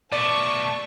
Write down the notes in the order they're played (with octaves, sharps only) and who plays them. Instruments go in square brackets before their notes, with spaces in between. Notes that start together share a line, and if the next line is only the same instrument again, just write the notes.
[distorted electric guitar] B2 A3 [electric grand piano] D5 [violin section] A5 C#6